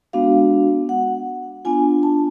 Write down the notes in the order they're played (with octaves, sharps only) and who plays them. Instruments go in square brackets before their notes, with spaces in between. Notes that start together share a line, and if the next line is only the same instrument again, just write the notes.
[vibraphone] G#3 B3 D4 F#4 F5
F#5
B3 D4 F4 G#5
A5